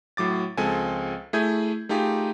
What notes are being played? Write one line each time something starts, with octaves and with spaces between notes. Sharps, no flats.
A2 F#3 D6 A6
C#2 F3 G#3 C4 A4 G#5
A3 E4 G#4 D#6 G6 G#6
A3 D#4 F4 G4 G#4